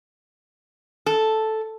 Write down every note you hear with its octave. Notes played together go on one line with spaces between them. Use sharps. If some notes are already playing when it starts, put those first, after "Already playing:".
A4